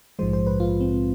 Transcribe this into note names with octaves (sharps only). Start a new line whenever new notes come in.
A#1 G#2 F3 G#3 C5
C5
B4
F4
C4